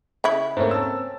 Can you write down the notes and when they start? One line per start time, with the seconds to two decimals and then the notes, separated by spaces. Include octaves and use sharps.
0.24 C#3 E4
0.57 G#2 A3 A#3 C4 C#4
0.71 A5 E6